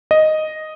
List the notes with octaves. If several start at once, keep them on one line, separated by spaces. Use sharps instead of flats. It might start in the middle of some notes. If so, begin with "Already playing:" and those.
D#5